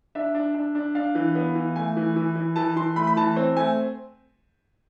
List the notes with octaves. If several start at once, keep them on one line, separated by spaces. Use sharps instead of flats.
D4 E5
D4
D4
D4
D4 F5
E3
B3
E3
A3 G#5
E3
E3
E3
E3 A5
E3 C6
A3 B5
B5
E3 A5
C4
A3 G#5